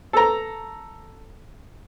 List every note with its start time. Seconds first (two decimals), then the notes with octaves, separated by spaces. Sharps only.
0.13 A4 A#5